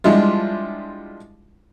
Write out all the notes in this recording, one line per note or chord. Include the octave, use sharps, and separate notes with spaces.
F3 G3 G#3 D4 E4 F4